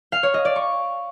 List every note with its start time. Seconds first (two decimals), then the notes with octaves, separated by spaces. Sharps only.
0.12 F5
0.23 C#5
0.34 D#5
0.45 D5
0.56 C#6